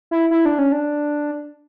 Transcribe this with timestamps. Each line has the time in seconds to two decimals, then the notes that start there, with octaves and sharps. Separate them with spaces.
0.11 E4
0.31 E4
0.45 D4
0.59 C#4
0.72 D4